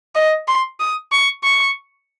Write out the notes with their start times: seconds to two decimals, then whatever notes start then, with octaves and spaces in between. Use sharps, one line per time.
0.15 D#5
0.47 C6
0.80 D#6
1.12 C#6
1.44 C#6